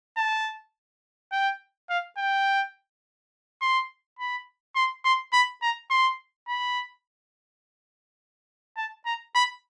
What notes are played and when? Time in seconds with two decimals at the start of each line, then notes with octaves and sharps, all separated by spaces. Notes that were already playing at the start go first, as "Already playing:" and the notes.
0.17 A5
1.32 G5
1.90 F5
2.18 G5
3.62 C6
4.19 B5
4.76 C6
5.05 C6
5.33 B5
5.62 A#5
5.90 C6
6.48 B5
8.77 A5
9.06 A#5
9.35 B5